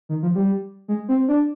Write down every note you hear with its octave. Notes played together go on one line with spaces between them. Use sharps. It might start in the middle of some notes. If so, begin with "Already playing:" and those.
D#3
F3
G3
G#3
C4
D4